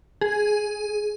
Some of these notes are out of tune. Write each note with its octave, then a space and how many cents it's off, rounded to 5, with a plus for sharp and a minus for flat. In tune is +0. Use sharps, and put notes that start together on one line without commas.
G#4 +10